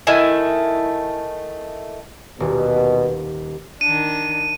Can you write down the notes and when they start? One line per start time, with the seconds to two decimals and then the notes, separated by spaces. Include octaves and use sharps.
0.07 D#3 A3 E4 G#5
2.40 D#1 B2
3.81 D#3 D4 D#7